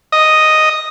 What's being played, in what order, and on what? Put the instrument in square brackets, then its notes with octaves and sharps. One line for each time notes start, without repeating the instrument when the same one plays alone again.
[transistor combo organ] D#5